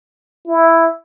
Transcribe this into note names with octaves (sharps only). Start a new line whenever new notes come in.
E4